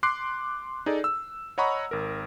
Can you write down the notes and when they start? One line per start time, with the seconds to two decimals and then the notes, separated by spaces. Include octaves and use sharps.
0.03 C6 D6 F#6 C7
0.86 D#4 G#4 A4 D5
1.04 E6
1.58 C#5 D#5 F#5 A#5 B5 C#6
1.91 G#1 A#4